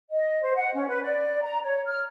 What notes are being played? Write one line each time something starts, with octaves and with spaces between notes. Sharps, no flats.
D#5
C5
F#5
C#4
B4
D5
A#5
C#5
F6